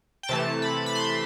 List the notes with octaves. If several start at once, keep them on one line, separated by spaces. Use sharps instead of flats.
G5
C3 E3 A3 A5
B5
B5
C6